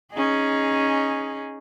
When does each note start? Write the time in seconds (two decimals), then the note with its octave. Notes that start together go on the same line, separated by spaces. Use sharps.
0.13 C#4 D#4 G#4